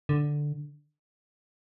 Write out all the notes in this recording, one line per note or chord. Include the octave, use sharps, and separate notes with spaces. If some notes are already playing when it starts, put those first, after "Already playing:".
D3